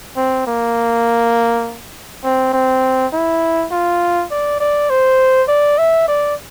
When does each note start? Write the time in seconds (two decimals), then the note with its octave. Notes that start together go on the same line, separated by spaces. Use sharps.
0.16 C4
0.47 A#3
2.24 C4
2.53 C4
3.13 E4
3.71 F4
4.31 D5
4.60 D5
4.90 C5
5.48 D5
5.78 E5
6.08 D5